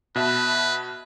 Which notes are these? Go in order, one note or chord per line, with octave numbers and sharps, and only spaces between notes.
B2 B4 E5 A5